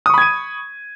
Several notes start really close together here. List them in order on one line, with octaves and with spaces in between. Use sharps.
D#6 C#6 B5 G#6 D#7